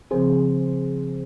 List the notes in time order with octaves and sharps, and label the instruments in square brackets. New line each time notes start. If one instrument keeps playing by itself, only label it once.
[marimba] C#3 F3 C4 [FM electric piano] G#4 C5